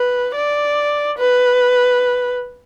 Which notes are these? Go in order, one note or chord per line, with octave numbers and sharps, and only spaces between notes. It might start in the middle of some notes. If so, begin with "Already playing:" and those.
Already playing: B4
D5
B4